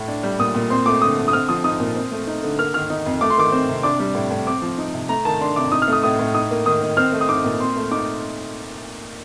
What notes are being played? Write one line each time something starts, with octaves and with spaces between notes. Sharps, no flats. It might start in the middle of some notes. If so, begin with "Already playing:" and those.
Already playing: A2
D4
G3
A#2 D#6
A#2
C4 C6
A3 D6
D3 D#6
D3
D#6
C4 F6
F3 D#6
D#4 D#6
A#2
C4
A3
D#4
D3
A#3 F6
D#3 F6
D#4
F2
A3 D6
C6
D#3 D6
C4
C3
D4 D6
G3
A2
A2
C4 D6
F3
D#4
C3
A3 A#5
D#3 A5
D4 C6
C3 D6
D#4 D#6
F6
A3 D#6
A2 D#6
A2
D#4 D#6
A#3
D#3 D#6
D#3
C4 F6
A3
D#6
D#4 D6
A#2
C4 C6
A3
D#4 D6